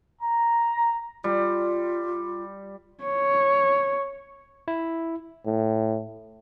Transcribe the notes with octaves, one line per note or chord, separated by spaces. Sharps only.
A#5
G3 F4
C#5
E4
A2